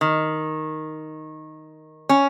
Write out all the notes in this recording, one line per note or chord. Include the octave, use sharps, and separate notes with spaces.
D#3
C#4